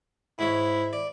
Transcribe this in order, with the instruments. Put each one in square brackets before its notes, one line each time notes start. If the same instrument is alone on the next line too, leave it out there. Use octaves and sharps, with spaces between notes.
[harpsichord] G#2 C#5 [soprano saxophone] E4
[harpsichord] D5